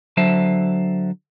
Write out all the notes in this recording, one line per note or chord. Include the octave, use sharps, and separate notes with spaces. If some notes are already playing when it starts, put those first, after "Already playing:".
D3 F#3 C5 E5 A5